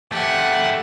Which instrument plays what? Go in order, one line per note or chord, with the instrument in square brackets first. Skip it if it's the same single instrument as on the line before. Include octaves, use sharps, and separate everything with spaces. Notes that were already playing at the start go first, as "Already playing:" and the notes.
[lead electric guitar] A3 G4 [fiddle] F#5 G#5